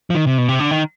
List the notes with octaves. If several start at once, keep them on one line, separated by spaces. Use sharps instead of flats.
F3
D#3
C3
B2
C3
D3
D#3